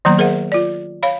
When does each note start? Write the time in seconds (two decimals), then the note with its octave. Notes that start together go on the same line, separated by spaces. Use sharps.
0.05 D#3 F#3 A#3 B3 A#5
0.18 G#4 A#4 C5 E5 F#5
0.52 F4 D5
1.03 C#5 F5 B5